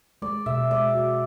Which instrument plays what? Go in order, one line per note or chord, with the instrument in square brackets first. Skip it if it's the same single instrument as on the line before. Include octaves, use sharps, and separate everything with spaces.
[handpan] G#3 [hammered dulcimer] D5
[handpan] B2 [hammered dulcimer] E5
[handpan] G#3 [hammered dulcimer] D5
[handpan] F#4